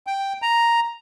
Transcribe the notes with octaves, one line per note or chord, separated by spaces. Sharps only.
G5
A#5